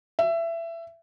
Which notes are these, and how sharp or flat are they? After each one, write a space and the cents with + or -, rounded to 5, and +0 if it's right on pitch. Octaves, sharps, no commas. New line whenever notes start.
E5 +20